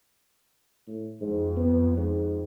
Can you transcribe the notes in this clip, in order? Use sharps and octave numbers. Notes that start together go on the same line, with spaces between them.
A2
F2 G#2
B3
G#2